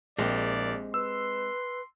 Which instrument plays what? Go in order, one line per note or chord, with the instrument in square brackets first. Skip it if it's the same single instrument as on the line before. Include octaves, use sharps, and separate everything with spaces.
[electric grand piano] A#1 [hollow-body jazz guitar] G#3 C4 G4 [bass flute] A#4 [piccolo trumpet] D5
[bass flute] B4 [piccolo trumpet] C6 [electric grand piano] E6